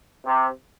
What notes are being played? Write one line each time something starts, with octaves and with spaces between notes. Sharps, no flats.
C3